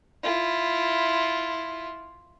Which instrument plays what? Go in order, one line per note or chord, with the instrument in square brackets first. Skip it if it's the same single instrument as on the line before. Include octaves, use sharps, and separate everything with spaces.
[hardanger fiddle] E4 F4